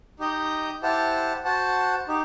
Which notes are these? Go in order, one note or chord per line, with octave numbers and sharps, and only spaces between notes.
D#4 G4 D#5 G5
E4 G4 C5 F#5 A5
F#4 C5 F#5 A5
D#4 G4